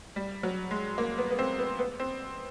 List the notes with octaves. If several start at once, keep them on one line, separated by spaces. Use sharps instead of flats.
G3
F#3
G#3
A#3
B3
B3
C4
B3
B3
C4